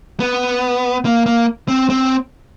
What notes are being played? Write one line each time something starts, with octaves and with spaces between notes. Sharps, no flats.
B3
A#3
A#3
C4
C4